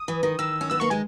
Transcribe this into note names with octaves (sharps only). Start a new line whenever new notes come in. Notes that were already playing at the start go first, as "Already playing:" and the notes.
Already playing: D#6
E3
D#3
D#3 E6
C#4
B3 E6
A#3 C#6
G#3 G#5